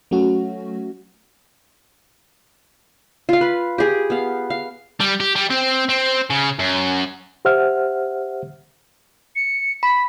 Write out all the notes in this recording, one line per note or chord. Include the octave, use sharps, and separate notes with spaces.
F#3 A3 C#4 F#4
F4 F5
B4
G4 G#4
B3 F5
F5
G3
G4
G3
C4
C4
C#3
F#2
G4 C5 E5 F#5 F6
C#7
B5 B6